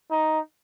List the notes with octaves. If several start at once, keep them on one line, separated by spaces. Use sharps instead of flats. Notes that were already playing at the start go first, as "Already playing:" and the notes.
D#4